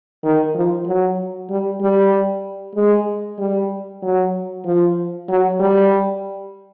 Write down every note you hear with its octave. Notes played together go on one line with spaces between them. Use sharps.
D#3
F3
F#3
G3
G3
G#3
G3
F#3
F3
F#3
G3